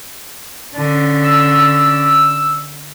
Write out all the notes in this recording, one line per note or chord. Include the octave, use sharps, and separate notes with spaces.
D3 C#4
E6